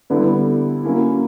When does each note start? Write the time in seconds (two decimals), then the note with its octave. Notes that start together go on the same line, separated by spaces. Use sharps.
0.10 D3 G3 B3 E4 G4
0.83 F#3 A#3 C#4 E4